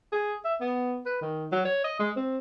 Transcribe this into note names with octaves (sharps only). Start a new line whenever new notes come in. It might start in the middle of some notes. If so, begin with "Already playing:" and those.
G#4
E5
B3
B4
D#3
F#3
C#5
D#5
G#3
C4